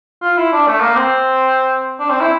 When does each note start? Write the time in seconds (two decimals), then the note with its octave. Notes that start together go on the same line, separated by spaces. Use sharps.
0.22 F4
0.37 E4
0.52 D4
0.67 A3
0.81 A#3
0.96 C4
1.99 D4
2.10 C4
2.21 E4